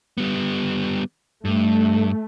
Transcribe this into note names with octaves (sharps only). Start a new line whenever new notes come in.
G3 B3
G2 A3